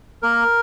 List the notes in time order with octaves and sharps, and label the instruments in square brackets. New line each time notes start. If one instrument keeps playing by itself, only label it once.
[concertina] A#3 A#4